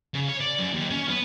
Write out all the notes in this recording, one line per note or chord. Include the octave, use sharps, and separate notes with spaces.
C#3
C#5
D5
F#2
D#2
C#4
B3